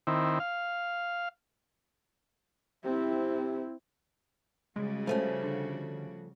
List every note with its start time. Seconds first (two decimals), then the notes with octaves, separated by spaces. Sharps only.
0.07 D#3 C4 E4
0.40 F5
2.85 C3 C4 E4
4.76 C#3 G3 G#3 F#4
5.07 F3 A3 C#4
5.43 D3